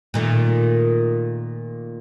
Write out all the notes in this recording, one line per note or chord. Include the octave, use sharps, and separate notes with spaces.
A#2 D#3 A3